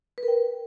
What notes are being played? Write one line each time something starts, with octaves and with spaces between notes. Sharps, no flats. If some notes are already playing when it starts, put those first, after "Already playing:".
B4
A#4
G5